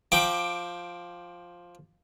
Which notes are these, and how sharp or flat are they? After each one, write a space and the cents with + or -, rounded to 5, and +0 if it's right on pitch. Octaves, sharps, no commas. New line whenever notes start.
F3 +5 G5 +0 D6 +15